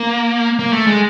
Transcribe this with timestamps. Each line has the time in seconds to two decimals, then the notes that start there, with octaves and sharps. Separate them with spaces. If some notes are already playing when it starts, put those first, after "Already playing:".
Already playing: A#3
0.59 A#3
0.72 A3
0.87 G#3